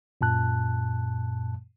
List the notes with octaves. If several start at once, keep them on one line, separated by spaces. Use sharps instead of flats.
F#2 A#2 A5 F#6